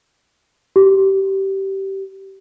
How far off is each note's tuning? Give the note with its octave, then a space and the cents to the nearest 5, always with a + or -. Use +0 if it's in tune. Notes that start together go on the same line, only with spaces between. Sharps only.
G4 -20